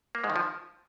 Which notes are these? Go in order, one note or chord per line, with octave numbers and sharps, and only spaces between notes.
A#3
G#2 G#3
D#3
F3